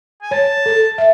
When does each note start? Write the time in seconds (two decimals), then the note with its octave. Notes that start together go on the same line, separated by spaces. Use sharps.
0.22 G#5
0.31 C#5 A5
0.66 A4
0.98 E5